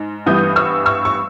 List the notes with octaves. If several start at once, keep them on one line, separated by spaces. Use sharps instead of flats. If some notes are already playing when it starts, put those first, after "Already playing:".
Already playing: G#2
G2 E3 G3 B3 D#6 G6
C#6 E6
C#6 E6
C#6